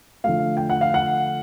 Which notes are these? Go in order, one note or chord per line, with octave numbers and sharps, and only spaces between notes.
D3 F3 A3 F5
G5
F#5
F5
F#5